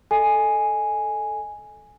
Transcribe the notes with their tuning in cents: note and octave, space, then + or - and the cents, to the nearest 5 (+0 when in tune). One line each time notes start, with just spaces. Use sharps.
A4 +0 D#5 -15 G#5 +0